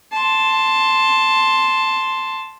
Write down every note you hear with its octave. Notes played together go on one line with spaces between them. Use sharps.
A5 C6